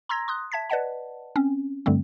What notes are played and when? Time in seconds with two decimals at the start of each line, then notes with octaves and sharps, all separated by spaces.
0.09 A#5 C6 E6 G#6 A#6
0.28 C6 D#6 F#6
0.52 E5 A5 G#6 B6
0.70 B4 D5 D#5 F#5 A5
1.36 C4 C#4
1.86 G2 D3 G3 A3 C4